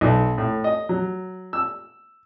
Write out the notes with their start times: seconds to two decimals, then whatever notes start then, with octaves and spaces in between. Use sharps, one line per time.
0.01 B1
0.38 A2
0.64 D#5
0.89 F#3
1.53 E6